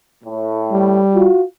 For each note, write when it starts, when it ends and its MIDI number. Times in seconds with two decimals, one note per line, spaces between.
0.24 1.00 45
0.72 1.27 55
1.14 1.42 65
1.14 1.42 66